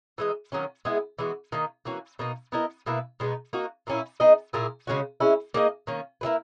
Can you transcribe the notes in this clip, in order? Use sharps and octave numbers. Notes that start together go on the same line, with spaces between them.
E3 G#3 D#4
D#3 F#3 A#3 C#4
G#3 B3 E4 G#4
E3 G#3 B3 F#4
D#3 A#3 D#4
E3 A#3 C#4 F#4
B2 A#3 D#4
B3 E4 A#4 D#5
B2 A#3 E4 B4
B2 G#3 B3 D#4
A#3 D#4 F#4
A#2 A#3 C#4 E4
B3 D#4 G#4 D#5
A#2 A#3 E4 G#4
C#3 G#3 C#4 F#4
G#3 C#4 E4
A#3 D#4 G#4 D#5
D#3 A#3 C#4
A#3 E4 G#4 B4